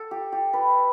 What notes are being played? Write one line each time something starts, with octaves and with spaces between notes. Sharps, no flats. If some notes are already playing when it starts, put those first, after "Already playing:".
Already playing: A4
G4
G4
B4